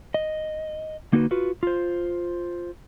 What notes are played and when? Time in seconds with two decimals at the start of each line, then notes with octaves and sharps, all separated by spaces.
0.14 D#5
1.13 D3 A#3 D#4 F#4 A4 B4
1.31 F4 F#4 B4
1.63 F4 C5